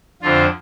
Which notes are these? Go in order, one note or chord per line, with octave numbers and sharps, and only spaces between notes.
F2 D3 F3 F4